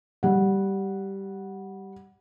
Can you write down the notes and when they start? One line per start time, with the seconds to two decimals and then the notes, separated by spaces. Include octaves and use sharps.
0.23 G3 F#5